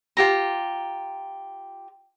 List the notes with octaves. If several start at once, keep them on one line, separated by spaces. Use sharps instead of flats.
F4 G4 A#5